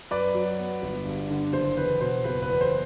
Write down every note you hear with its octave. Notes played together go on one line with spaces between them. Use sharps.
F#2 B4 D5
F#3
B3
G1
G2
D3
F#1 C5
E2 B4
B2 C5
F#1 B4
B4
E2
C5